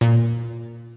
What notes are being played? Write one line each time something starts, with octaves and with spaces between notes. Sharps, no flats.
A#2